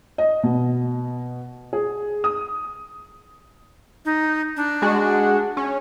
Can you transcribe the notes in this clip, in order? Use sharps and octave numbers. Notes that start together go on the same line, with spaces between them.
D#5
B2
G#4
D#6
D#4
D4
G#3 F#4
C#4